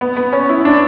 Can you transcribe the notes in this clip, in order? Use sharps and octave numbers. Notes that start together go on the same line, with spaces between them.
B3
B3
C#4
E4
D4